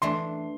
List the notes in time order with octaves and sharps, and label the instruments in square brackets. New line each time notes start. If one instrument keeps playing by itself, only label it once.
[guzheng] E3 A3 D4 [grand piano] C6